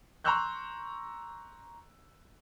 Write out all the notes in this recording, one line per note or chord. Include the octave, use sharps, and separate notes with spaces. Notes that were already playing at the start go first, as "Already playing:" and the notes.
A#5 C6 C#6 E6 F#6 G6